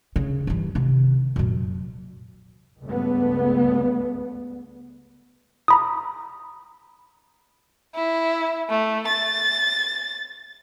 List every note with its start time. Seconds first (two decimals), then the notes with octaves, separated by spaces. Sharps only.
0.16 C#3
0.47 G2 E3
0.75 C3 D#3
1.36 F#2 A#2
2.83 C#2 G2 A3 B3
5.68 A#5 B5 D#6
7.95 E4
8.69 A3
9.08 A6